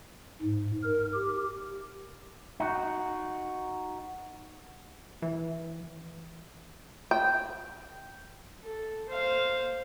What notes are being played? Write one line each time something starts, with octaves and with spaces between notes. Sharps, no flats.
G#2
A#4
G4
D#4 F#4
E3
G5
A4
C5 F5